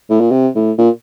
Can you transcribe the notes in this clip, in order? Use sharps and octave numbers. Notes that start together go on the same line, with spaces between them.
A2
A#2
C3
A2
A#2